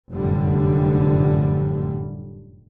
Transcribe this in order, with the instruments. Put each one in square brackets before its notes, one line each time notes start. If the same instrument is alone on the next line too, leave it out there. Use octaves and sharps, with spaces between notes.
[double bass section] F1 F#2 A2 D3 G3